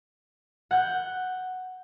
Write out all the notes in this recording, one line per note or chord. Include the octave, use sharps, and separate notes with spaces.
F#5 G6